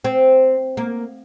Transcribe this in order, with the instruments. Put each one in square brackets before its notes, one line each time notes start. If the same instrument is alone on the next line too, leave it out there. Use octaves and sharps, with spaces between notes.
[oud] C4
A#3